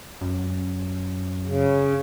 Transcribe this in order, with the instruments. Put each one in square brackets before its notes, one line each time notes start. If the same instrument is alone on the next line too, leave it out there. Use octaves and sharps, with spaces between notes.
[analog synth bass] F#2
[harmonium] C#3